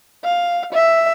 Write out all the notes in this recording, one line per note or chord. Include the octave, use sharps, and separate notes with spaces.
F5
E5